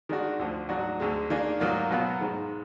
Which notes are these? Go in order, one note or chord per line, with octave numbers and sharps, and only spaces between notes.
D#3 G#3 D4 F#4
D2 D3 F3
G#2 F#3 D4 F#4
D2 D3 G#3
D#3 A#3 D4 G#4
G#2 D#3 F#3 A#3 F4
B2 F#3 B3 F4
G#2 D#3 G#3